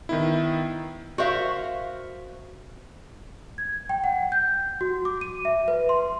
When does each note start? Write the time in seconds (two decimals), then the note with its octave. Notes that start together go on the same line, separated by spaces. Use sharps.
0.09 D#3 B3 E4
1.18 F#4 A#4 C5 E5 F5
3.58 G#6
3.89 G5
4.04 F#5
4.32 G6
4.81 F#4
5.05 D6
5.21 D#7
5.45 E5
5.68 B4
5.89 C6